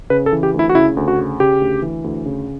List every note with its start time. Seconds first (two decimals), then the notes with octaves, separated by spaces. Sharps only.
0.10 C#3 B4
0.26 A4
0.32 E3
0.43 G4
0.54 D2
0.59 E4
0.69 F#4
0.75 C#3 E4
0.97 D2
1.08 F#4
1.18 C#3
1.40 C#3 G4
1.61 D2
1.82 E3
2.04 D2
2.26 C#3